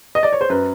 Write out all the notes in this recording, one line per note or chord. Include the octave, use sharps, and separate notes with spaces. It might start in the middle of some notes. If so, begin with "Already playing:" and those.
D#5
D5
C#5
C5
F#2 B4